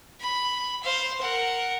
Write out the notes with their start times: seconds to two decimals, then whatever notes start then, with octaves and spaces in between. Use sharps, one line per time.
0.21 B5
0.83 C5 F5
1.21 A#4 F#5